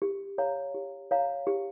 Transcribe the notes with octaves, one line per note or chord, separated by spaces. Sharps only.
G4
C#5 F5 A#5
G4
C#5 F5 A#5
G4